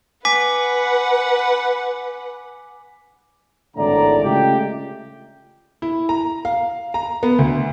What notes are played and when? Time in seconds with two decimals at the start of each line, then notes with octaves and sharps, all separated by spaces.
0.25 B4 F#5 G#5 D6 B6
3.77 G#1 E2 A2 D3 D5 A#5
4.24 C#3 G#3 A3 F4 G4
5.82 E4
6.09 A#5
6.45 F5
6.94 A#5
7.23 B3
7.39 D2